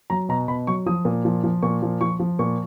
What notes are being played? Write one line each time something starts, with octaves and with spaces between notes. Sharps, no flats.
F#3 A#5
B2 A#5
B2 B5
F#3 C#6
F3 D#6
A#2
F3
F3
A#2 C#6
F3
F3 C#6
F3
A#2 C#6